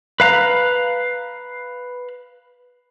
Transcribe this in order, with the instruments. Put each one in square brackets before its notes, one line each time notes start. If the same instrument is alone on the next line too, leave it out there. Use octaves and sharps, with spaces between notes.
[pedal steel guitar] B4 F5 A#5 F#6